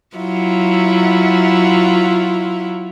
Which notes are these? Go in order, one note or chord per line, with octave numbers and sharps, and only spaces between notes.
F#3 E4 F4